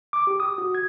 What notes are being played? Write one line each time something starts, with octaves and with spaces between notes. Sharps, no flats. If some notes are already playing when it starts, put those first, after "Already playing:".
D6
G4
D#6
F#4
G#6